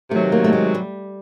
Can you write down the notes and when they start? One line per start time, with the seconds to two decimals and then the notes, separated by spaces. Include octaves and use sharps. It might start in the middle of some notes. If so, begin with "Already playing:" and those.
0.11 C3 D#3 F#3 A3
0.32 A#3
0.44 A3
0.53 G#3
0.74 G3